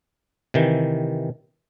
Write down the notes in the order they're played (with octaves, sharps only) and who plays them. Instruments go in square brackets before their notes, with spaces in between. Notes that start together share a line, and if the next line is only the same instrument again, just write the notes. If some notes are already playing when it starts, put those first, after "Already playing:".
[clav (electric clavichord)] C3 D#3 E3